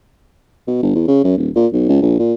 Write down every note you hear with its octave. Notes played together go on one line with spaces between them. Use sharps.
B2
G1
E2
C#3
F#2
D#1
A#2
B1
C#2
A#1
A#2